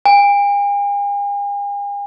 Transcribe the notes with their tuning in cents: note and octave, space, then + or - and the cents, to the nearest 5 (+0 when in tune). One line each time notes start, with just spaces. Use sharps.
G#5 -45